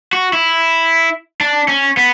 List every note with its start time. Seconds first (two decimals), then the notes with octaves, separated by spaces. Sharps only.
0.13 F#4
0.33 E4
1.41 D4
1.68 C#4
1.97 B3